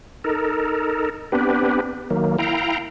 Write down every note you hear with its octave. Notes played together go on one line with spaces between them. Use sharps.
D#4 A4 A#4
B3 C4 D4 G4 B4
D#3 F#3 A#3
E4 F5 G5 A#5